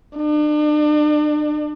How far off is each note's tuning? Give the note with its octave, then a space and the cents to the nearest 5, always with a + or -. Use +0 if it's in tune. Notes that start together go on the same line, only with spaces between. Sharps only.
D4 +40